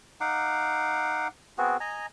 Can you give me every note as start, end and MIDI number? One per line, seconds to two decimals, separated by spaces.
0.21 1.28 63
0.21 1.28 77
0.21 1.28 78
0.21 1.28 86
1.58 1.77 59
1.58 1.77 60
1.58 1.77 66
1.58 1.77 68
1.80 2.06 75
1.80 2.06 80
1.80 2.06 82